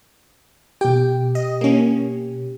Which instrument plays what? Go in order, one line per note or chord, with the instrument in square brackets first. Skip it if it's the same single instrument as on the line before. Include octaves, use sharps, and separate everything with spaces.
[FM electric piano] B2 G4 [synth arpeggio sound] G5
[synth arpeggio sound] D#5
A#3 C#4